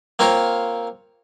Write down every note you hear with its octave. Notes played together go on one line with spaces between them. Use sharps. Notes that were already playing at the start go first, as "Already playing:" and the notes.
A#3 C4 F4 A#4 C#5